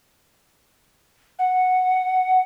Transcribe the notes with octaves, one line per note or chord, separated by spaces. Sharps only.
F#5